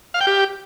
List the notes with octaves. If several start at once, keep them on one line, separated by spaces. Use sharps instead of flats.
F5
G5
G4